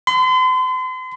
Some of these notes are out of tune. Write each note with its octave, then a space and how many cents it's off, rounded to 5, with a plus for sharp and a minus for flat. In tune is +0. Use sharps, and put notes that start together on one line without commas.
C6 -40